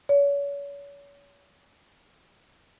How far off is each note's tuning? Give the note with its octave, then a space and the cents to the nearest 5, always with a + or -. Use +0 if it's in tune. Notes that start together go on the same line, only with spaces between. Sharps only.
C#5 +35